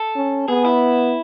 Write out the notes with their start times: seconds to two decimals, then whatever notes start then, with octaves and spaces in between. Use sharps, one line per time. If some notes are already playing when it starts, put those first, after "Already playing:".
Already playing: A4
0.16 C#4
0.48 B3 G#4
0.65 E4